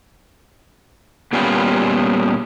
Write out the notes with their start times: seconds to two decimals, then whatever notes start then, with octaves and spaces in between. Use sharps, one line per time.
1.33 A#2 G3 B3 C#4 F4 G4